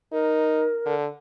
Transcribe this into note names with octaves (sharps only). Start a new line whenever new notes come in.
D#4 A#4
D3